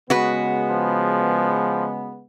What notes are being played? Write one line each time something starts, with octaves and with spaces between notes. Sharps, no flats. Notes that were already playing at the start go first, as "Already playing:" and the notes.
C#3 G#3 B3 F#4 B4
F3